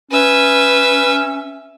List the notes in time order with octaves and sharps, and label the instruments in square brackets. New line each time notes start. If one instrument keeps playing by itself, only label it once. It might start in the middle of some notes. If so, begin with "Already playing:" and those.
[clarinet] C#4 [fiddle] B4 E5